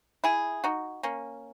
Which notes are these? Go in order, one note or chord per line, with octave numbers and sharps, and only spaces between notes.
E4 G#4
D#4 F#4
A#3 C#4